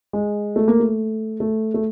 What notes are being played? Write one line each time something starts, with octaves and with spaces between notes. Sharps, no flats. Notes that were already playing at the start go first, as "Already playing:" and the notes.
G#3
A3
A#3
A3
A3
A3